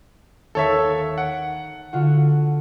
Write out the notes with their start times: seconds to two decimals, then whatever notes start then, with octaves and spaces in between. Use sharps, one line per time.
0.55 D#2 A4 C#5 E5
1.18 F#5 D7
1.93 D3 F4 F#4